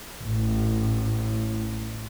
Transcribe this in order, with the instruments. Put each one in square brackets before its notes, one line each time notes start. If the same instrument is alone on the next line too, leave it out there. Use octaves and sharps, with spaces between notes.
[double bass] A1 A2